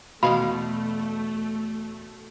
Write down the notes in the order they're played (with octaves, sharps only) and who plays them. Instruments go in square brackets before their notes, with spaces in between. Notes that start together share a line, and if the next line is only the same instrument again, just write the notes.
[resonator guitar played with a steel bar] E2 G#3 F5 [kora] B2 [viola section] A3 [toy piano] B5